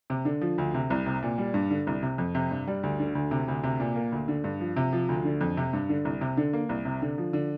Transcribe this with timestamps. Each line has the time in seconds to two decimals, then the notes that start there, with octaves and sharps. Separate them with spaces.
0.10 C3
0.25 D3
0.41 F3
0.58 D2
0.74 C3
0.90 C2
1.06 C3
1.22 A#2
1.38 G3
1.54 G2
1.71 D3
1.87 C2
2.03 C3
2.18 F2
2.35 C3
2.51 G2
2.67 G3
2.83 D2
3.00 D3
3.15 D2
3.31 C3
3.48 D2
3.63 C3
3.80 A#2
3.96 A#3
4.12 D2
4.28 D3
4.44 G2
4.60 F3
4.76 C3
4.93 F3
5.09 D2
5.25 D3
5.41 F2
5.57 C3
5.73 G2
5.89 D3
6.05 C2
6.21 C3
6.37 D3
6.53 A#3
6.69 C2
6.85 C3
7.02 D3
7.18 F3
7.33 D3